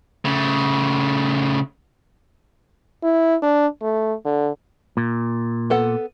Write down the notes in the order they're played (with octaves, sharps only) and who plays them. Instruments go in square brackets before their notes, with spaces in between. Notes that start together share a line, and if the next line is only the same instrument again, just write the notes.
[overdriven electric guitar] C#3 A3
[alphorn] E4
D4
A3
D3
[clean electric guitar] A#2
[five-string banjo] B3 A4 F#5